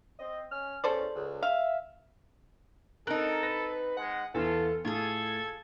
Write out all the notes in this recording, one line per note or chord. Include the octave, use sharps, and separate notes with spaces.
C4 D#5
C#4 G#5 F6
E2 C#4 A4 C5 D5
C#2
E5 F5
C4 D#4 A4 A#4 F#6
B4 A#6
G#3 F#5
E2 E3 F4 A4
A2 F4 G#4 A4 G#6